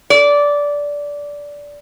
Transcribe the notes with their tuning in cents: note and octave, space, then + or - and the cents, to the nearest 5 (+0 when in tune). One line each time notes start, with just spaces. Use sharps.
D5 -15